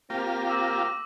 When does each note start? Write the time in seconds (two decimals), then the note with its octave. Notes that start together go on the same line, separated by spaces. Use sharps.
0.10 A#3 C4 F4 G4 A#6
0.47 D6 E6